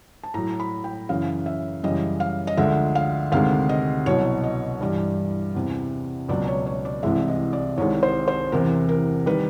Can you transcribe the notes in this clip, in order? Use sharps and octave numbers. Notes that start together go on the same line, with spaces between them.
A5
A2 F#3 A#5
B5
G5
F#2 C#3 E3 F5
E5
F#2 C#3 E3 G3 D#5
F5
D#5
D2 D3 F3 G#3 E5
F5
D2 C3 D#3 G#3 F5
D#5
C2 B2 F#3 C#5
D#5
G2 E3 G3
E2 C3 E3
C#2 B2 F#3 D5
C#5
C#5
D5
C2 C3 E3 G#3 E5
D#5
D5
C2 C3 D#3 G#3 C#5
C5
C5
E2 C3 E3 A#4
A#4
D#3 G3 B4